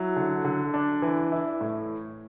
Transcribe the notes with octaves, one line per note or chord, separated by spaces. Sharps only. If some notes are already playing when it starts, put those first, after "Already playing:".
Already playing: F#3 E4
D3
D3
D4
E3
E4
A2